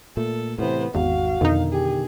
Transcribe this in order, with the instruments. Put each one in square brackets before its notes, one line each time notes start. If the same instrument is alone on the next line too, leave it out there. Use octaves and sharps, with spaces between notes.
[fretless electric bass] A#2 A3 [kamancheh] A4
[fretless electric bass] A2 E3 [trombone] C3 [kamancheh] B3 C5
[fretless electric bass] G#1 [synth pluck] E2 [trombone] F#4 [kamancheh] F5
[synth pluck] F2 D#4 [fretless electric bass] B2 D3 D#3
[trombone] G4 [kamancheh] G#4